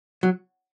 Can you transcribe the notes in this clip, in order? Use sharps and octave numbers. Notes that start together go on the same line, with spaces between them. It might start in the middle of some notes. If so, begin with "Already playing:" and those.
F#3